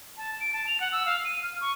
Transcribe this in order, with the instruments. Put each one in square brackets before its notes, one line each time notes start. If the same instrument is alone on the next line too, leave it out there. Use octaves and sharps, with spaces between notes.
[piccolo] A5
D7
A5
F7
F#5
E6
F5
D#7
F6
C#6